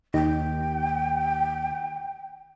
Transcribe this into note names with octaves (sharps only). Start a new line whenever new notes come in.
D#2 D#4 G5